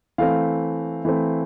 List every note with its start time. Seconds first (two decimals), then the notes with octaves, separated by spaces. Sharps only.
0.18 E3 A3 C4 F5
1.05 E3 A3 C4